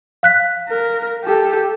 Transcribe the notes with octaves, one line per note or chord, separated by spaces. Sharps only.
F5 F#6 B6
A#4
G4 A4